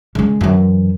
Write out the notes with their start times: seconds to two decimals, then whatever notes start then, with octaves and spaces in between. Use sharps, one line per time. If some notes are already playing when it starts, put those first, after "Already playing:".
0.15 C#3 G#3
0.41 F#2 E3